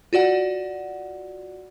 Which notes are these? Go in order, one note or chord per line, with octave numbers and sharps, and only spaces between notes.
F4 F#4 D5 F#5